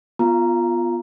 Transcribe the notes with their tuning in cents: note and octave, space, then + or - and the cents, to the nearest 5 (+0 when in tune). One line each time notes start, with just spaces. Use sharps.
B3 -5 F4 +0 A#5 +0